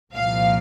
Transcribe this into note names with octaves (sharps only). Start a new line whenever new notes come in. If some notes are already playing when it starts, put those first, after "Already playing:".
C2 A#2 F3 F5